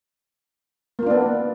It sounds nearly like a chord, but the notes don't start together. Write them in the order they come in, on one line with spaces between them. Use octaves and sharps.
A#3 F4 D4 B3